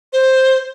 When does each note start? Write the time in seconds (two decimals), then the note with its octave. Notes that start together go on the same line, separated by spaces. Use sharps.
0.13 C5